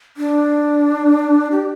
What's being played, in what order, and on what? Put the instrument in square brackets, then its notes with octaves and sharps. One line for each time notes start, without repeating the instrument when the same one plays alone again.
[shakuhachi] D4
G4